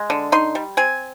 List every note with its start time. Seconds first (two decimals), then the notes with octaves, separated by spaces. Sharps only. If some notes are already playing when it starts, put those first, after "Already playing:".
Already playing: G#3
0.10 D3
0.32 D#4 C6
0.55 G3
0.77 C4 G#5